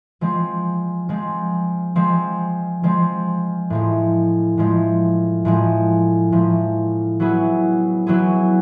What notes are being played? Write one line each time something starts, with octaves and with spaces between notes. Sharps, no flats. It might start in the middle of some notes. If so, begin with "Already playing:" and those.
F3 G#3 C4
F3 G#3 C4
F3 G#3 C4
F3 G#3 C4
A2 F3 G#3
A2 F3 G#3
A2 F3 G#3
A2 F3 G#3
F#3 B3 E4 G#4
F#3 B3 E4 G#4